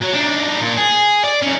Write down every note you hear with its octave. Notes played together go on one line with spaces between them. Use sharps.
F#3
D4 D#4
A#2
G#4
D5
D#3 C#4